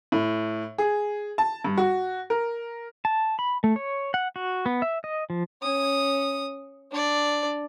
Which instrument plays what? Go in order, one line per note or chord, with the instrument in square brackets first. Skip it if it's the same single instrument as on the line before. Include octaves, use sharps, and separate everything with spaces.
[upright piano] A2
G#4
A5
G2
F#4
A#4
[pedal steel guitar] A5
B5
A3
C#5
F#5
F#4
B3
E5
D#5
F3
[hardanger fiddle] C#4 D#6
D4 D5